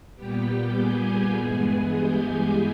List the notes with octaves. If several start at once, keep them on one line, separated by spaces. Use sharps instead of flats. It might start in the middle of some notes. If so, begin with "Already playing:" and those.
A#2 G3 B3 G4 G5
G#4 G#5
G2 E3 G#3 B3 G#4 G#5
G4 G5